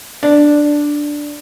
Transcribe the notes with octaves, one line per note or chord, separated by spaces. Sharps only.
D4